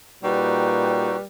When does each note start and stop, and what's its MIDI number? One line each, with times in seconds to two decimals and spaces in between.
0.23 1.17 46
0.23 1.25 55
0.23 1.16 63
0.23 1.16 66
0.23 1.19 71
0.23 1.16 79